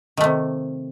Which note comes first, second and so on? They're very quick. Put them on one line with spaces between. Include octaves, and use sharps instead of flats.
D#3 A3 C3